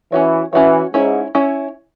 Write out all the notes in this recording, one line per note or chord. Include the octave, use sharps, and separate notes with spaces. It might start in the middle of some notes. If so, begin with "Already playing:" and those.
E3 C#4 F#4 C#5
E3 C#4 F#4 C#5
G#2 C#4 E4 C#5
C#4 E4 C#5